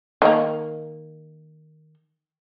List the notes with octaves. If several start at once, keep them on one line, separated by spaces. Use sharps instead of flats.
D#3 F#3 A#3